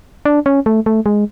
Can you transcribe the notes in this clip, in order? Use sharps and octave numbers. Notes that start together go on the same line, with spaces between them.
D4
C#4
A3
A3
G#3